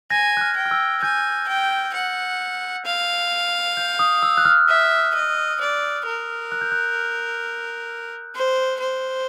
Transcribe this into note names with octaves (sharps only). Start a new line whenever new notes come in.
G#5 G#6 A#6
F#6
F6
G5
F6
E6
G#5 G6
G5
F#5
F5
G6
D#6
E6
F#6
F6
E5
D#5
D5
A#4
F#6
G6
F#6
C5
C5